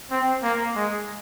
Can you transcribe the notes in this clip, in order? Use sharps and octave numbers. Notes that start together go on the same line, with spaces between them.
C4
A#3
G#3